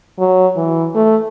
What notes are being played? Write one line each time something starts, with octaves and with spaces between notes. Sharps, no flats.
F#3
E3
A3